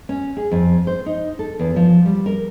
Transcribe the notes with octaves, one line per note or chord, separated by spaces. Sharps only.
C#4
G#4
F2
C5
D#4
A4
E2
F3
G3
A#4